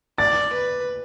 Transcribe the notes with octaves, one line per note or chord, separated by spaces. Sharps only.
D5 A6
B4